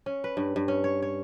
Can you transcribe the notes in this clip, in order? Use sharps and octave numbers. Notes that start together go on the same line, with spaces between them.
C#4
B4
G2
G2
C#4
C#5
C#5